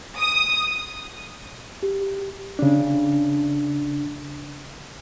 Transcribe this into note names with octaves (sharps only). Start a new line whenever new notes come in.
D#6
G4
C#3 D4